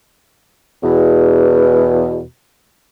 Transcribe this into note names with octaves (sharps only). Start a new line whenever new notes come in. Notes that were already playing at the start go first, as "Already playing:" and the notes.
E2 B2